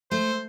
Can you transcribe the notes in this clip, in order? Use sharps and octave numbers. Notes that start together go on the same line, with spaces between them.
A3 C5